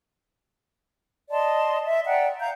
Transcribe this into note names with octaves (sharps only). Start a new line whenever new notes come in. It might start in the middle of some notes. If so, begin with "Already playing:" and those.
D5 D#5 A5 C6
E5
D5 F#5 G5 A#5
F5 A#5 G6